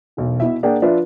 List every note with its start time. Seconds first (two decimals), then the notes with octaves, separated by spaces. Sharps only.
0.17 E1 B1
0.40 B2 E4 E5
0.63 A#3 D4 G#4 D5 F#5 G5
0.82 F3 D4 F4 B4 E5